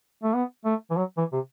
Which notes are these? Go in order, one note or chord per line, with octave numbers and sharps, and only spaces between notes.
A3
B3
A3
E3
F#3
E3
C3